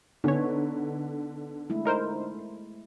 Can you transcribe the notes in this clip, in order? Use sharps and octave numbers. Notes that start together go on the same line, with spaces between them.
D3 B3 C#4 D#4 C#5
G#3 A3 E4
D#4 A#4 C5